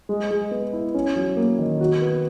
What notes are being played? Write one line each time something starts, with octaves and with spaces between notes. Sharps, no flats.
G#3
G#3
B3
E4
C#4
F#3
A#3
D#3
F#4
B3